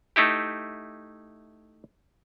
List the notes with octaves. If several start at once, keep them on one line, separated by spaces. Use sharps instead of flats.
A3 D#4 E4 G4